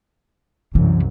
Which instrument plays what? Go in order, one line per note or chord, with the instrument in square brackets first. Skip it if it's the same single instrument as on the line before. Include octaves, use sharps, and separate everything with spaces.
[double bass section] C2 F#2 [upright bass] E3